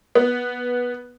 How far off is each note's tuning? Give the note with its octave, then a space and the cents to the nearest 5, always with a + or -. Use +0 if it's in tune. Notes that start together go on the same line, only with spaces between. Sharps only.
B3 -10